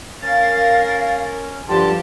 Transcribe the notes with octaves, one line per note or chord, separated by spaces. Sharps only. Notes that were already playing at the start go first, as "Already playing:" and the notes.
C#4 A#4 F5 A6
G2 D3 F3 G4 A5 C6